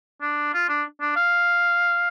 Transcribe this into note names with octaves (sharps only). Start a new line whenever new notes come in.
D4
F4
D4
D4
F5